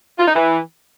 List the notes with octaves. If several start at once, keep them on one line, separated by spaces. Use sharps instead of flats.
F4
D#4
E3